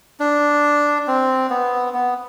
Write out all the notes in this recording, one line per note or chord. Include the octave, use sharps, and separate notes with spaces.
D4
C4
B3
B3